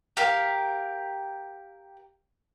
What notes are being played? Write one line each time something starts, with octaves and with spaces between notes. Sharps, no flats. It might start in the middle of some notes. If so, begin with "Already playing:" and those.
G4 A#4 F5